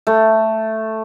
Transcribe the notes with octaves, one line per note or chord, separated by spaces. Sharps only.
A3